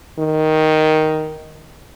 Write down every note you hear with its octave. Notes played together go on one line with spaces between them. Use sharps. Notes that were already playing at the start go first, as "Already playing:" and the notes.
D#3